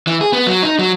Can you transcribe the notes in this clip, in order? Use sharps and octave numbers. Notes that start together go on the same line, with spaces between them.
E3
G#4
B3
F#3
D#4
F#3